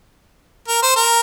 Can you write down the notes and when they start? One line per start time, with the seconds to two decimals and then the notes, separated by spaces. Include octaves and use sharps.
0.68 A#4
0.82 C5
0.96 A#4